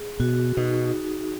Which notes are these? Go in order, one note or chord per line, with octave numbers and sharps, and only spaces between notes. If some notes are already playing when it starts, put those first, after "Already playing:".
Already playing: G#4
B2 F#4
B2 D#4